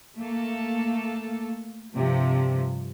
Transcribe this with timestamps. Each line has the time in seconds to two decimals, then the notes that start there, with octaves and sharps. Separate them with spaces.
0.16 A3 A#3 A4
1.92 G2 C3 F3